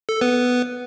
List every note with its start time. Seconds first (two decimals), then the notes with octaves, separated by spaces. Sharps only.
0.09 A4
0.21 B3 B4